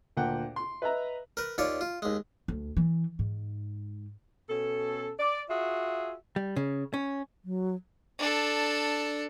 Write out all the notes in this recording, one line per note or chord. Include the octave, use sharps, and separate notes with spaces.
D2 A#2 F#5 G5
C6
B4 D#5 E5 A#5
A#4 B4
D#2 F4 C#5 D5
F4
D#2 G#3
D2
E3
G#2
B2 C#4 A4
D5
F4 F#4 G#4 E5
G3
C#3
C#4
F#3
D4 A4